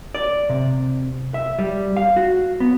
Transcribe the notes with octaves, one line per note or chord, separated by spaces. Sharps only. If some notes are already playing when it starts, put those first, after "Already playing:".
D5
C3
E5
G3
F5
F#4
B3